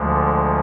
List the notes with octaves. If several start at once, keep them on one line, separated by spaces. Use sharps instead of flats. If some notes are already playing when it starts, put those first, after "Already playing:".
Already playing: D2 D3 F3 G#3